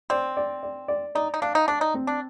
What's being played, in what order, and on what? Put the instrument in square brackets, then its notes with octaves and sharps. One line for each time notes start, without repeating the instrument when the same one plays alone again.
[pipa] C4 [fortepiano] D5
[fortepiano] D5
D5
D5
[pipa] D#4 [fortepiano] D5
[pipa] D#4
[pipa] D4 [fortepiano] F5
[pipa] D#4
[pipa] D4 [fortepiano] D5
[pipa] D#4
[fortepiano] C4
[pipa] D4